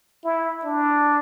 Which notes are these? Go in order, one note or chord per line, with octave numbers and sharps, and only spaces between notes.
E4
D4